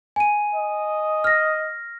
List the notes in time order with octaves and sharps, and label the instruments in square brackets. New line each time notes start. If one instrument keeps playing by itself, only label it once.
[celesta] G#5 D#7
[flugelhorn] D#5
[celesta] F6 A#6